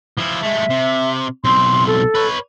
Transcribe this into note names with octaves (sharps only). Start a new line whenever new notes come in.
F3 E4
G#3 A3 E5
C3
B1 C4 C6
A4
B4 C#5